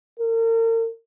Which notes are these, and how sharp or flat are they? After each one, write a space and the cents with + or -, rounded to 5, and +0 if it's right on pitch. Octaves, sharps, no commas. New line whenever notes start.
A#4 -40